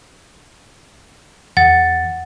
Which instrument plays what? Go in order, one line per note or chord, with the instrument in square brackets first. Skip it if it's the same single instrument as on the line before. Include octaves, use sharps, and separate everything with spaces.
[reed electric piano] E2 A6 [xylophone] F#5